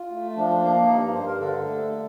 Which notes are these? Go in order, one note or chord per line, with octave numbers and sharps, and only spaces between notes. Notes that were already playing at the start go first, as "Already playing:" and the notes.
Already playing: F4
A3
F3 D4
D4
A#3 D4
D4
G2 D#4
G2 C5
A#4
D3 A4
A3